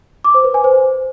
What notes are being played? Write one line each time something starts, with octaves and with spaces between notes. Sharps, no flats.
D6
C5
B4
G#5
C5